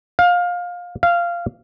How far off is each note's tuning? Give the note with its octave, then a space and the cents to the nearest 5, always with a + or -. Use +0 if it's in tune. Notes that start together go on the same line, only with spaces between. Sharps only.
F5 +20
F5 -15